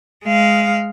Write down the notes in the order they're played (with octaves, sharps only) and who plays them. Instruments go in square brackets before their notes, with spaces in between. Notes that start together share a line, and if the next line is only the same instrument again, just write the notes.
[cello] G#3 F5